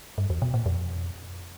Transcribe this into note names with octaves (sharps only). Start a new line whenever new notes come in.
G2
E2
B2
A#2
F2